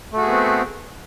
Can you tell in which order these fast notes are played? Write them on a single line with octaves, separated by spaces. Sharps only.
A3 F#4 G#4 B3 C4